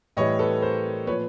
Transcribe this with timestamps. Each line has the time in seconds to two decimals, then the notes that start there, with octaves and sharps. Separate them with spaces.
0.17 A2 E3 G3 C#5 D#5
0.39 A4 B4
0.62 A#4 C5
1.07 A#2 F3 B4 C#5